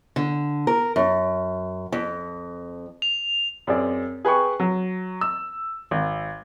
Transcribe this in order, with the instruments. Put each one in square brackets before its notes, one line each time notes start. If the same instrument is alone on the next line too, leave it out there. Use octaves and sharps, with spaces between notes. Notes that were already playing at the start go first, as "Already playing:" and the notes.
[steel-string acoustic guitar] D3
A#4
F#2
F2
[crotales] F7
[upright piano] F#2 C4 G#4 D5
G#4 B4 G5 C#6
F#3
E6
G#1